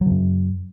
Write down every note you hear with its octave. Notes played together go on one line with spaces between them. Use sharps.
F#2 C#3 F#3